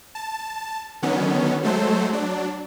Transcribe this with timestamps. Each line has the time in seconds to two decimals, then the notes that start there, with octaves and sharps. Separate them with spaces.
0.15 A5
1.02 D3 D#3 F#3 B3 C#4
1.63 F#3 G#3 A3 A4 C5
2.09 F#3 D4